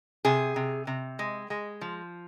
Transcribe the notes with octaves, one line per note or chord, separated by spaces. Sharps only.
C3 G#4
C3
C3
G#3
G#3
F3